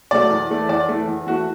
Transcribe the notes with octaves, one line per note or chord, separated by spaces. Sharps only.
B2 F#3 A3 D5
E2
E3 A3
E2 D5
E3 A3
E2
E3 A3 F#4